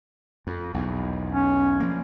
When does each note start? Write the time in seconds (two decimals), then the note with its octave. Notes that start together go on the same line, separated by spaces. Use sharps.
0.47 F2
0.74 B1 E2
1.32 C#4
1.80 F3 A#3